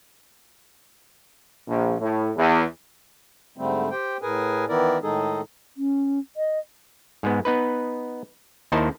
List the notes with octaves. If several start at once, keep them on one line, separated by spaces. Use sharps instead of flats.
A#1
A2
E2
G#2 D3 G3 A3 C4
G4 C5 G5
A2 G#4 A#4 B4 G#5
D#3 E3 B3 E4 A#4 D5
A2 D#3 G#3 D#4 G#4 A4
C#4
D#5
G#2 G#3 B3
B3 D#4 B4
D#2 D#3 D#4 E4 C5 A5